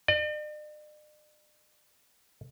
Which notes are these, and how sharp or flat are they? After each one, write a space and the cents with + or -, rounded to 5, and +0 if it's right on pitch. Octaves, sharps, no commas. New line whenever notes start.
D5 +45